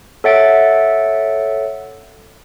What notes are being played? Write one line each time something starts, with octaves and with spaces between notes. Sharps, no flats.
A4 C#5 E5 F#5 A6 D7